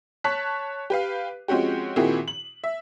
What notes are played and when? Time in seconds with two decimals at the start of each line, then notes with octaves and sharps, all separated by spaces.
0.24 C#5 A5 F#6 B6
0.90 G4 B4 F5
1.48 F3 G#3 C4 C#4 F#4 G4
1.96 A#2 D#3 C4 E4 F#4 G#4
2.28 F#7
2.64 E5